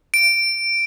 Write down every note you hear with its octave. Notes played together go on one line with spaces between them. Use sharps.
D7